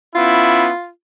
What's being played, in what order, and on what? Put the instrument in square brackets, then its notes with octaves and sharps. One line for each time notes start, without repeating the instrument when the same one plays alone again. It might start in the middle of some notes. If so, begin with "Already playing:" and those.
[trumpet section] B3 C#4 E4 [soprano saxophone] F4